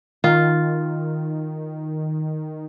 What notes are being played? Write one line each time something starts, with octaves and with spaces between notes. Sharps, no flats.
D#3 F4